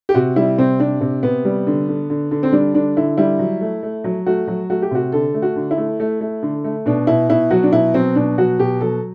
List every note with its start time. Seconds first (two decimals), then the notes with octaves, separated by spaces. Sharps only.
0.09 G4
0.14 C3 F#4
0.36 G3 E4
0.58 C3 C4
0.80 C3 D4
1.01 C3
1.23 C3 B3
1.45 G3
1.67 D3
1.89 D3
2.10 D3
2.31 D3
2.43 C4
2.53 G3 D4
2.74 D3 D4
2.97 D3 E4
3.18 G3 E4
3.39 F#3
3.61 A3
3.83 A3
4.04 F#3
4.26 A3 F#4
4.48 F#3
4.70 A3 F#4
4.82 G4
4.91 C3 F#4
5.12 D3 A4
5.34 A3
5.42 F#4
5.56 D3
5.71 E4
5.78 A3
6.00 A3
6.21 A3
6.43 D3
6.64 A3
6.86 B2 D4
7.07 B2 E4
7.29 B2 E4
7.50 F#3 F#4
7.63 D4
7.73 B2 E4
7.94 F#3 C4
8.15 B2 D4
8.38 F#3 F#4
8.59 B2 G4
8.80 F#3 A4